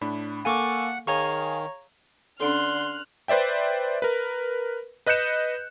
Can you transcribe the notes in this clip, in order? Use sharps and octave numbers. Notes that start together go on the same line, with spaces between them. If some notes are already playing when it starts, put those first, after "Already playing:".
A2 D4 B5
A#3 A4 F5 F#5 G#5 C#6 D6
D#3 G#4 C#5 F5 G#5 A#5 C#6
D3 C#4 D4 A4 C6 F6 F#6
B4 C5 D5 E5 G5
A#4 B4
B4 D#5 F#6 G6 C#7 E7